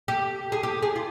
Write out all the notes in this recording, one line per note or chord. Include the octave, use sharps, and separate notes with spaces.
G4
G#4
G4
G#4
F4